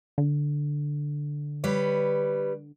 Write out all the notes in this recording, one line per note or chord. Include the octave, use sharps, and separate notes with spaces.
D3
G3 B4 C#5